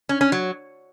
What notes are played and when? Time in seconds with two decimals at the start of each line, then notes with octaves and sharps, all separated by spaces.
0.09 C#4
0.21 C#4
0.32 F#3